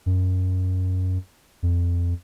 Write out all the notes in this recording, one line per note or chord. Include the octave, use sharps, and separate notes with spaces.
F#2
F2